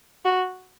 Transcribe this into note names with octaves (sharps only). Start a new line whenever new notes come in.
F#4